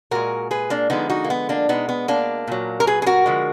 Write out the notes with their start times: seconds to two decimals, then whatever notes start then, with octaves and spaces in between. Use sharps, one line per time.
0.11 A#2 G#3 F#4 A#4
0.51 G#4 B4
0.70 A#3 D4
0.90 D3 F3 G#3 B3 D#4
1.09 D#4 F#4
1.24 A#3
1.30 B3
1.49 A#3 D4
1.69 B2 G#3 B3 D#4
1.89 B3
2.08 A#3 D4
2.47 A#2 F#3
2.80 A#4
2.87 G#4 B4
3.02 G#4
3.06 F#4 A#4
3.26 D3 F3 G#3